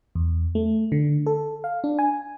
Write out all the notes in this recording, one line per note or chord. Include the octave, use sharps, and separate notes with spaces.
E2
A3
D3
A4
F5
D4
G#5